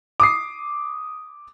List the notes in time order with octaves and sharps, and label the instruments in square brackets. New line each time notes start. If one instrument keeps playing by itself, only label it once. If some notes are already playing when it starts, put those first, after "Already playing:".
[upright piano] D6 D#6 C7